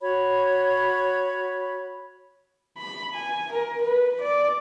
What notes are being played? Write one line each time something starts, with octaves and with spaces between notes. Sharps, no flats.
F#4 C#5 B5
B5
G#5
A#4
B4
D5